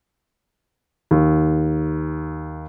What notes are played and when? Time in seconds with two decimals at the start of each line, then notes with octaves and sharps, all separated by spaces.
1.11 D#2